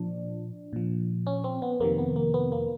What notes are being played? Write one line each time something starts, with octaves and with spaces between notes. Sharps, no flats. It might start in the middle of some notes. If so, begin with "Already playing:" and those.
Already playing: A#2 F3 D4
A#2 F3
C#4
C4
B3
F2 C3 D#3 A#3
B3
A#3
B3
A#3